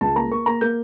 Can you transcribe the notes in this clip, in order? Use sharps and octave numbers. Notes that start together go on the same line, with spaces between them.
C#2 A5
A#3 A#5
A#3 C#6
A#3 A#5
A#3 G6